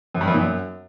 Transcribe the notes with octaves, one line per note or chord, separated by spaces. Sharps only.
F#2
G2
F#2
A#2
F#2